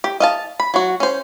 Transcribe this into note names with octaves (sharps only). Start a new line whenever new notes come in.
G4
D#5 F5 A5
B5
F#3 F#4
C#4 C5